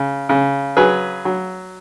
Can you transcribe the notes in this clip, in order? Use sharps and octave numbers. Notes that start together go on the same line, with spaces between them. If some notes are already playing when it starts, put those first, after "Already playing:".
Already playing: C#3
C#3
F#3 G#4 B4
F#3